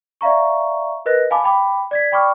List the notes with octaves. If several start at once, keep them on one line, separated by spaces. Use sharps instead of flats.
D5 E5 F5 A#5 C#6
A#4 B4 D#5 F#6 A#6
F5 G#5 A5 B5 D6
G5 B5 D6
D5 G#6 B6
D5 G5 B5 C#6 D6 F6